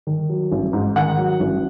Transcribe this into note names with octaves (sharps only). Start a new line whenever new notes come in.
D#3
F#3
A1
G#2
D#3 F#5
F#3
A1